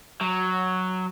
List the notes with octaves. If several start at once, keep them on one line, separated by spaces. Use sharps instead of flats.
F#3